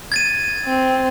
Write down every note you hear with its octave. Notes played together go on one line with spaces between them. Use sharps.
G#6 A6 D#7
C4